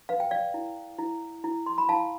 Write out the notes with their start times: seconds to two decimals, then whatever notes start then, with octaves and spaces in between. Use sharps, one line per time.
0.09 B4 F5
0.20 G5
0.31 D5 F5
0.54 E4
0.98 E4
1.44 E4
1.66 C6
1.78 B5
1.89 E4 F5 A5